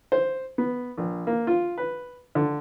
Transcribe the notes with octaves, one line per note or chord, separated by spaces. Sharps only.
C5
B3
A#1
A#3
F4
B4
D3